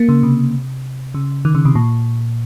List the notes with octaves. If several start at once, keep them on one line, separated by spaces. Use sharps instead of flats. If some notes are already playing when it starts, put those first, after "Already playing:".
Already playing: A#3
C#3
C3
C#3
D#3
C#3
C3
A#2